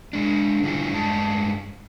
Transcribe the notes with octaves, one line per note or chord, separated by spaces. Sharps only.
G#3 D4
D3 G3 E4 F4 G#4
G2 G#3 D5 A5